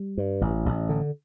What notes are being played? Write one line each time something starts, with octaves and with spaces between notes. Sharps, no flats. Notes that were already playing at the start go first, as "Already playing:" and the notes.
Already playing: G3
G2
A1
A1
D3